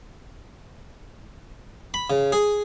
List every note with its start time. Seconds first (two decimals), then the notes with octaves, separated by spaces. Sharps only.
1.94 B5
2.10 C#3
2.32 G#4